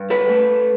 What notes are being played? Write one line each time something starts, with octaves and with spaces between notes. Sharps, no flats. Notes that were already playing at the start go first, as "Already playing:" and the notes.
Already playing: G2
A4 B4
A3